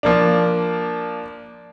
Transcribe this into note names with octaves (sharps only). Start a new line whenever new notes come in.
F3 A#3 D4